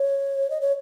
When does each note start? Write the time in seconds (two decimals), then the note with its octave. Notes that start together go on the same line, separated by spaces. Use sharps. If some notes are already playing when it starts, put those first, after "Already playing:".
Already playing: C#5
0.50 D#5
0.61 C#5